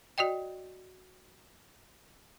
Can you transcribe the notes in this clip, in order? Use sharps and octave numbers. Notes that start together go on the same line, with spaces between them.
F#4 D5 D#5 G5